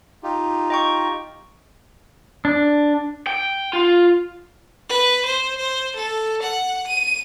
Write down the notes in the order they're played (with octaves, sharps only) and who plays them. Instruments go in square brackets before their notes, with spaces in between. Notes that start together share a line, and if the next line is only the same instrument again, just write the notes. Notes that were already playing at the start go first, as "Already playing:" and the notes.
[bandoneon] D#4 F4 G4
[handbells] D#5 G5 C#6
[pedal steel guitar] D4
[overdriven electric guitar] G5
F4
[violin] B4
C5
C5
A4
F#5
D#7